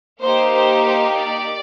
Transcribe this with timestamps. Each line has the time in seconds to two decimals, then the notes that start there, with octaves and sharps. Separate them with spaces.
0.22 A#3 D#4 G4 C5
0.53 C5
0.86 C5
1.18 D5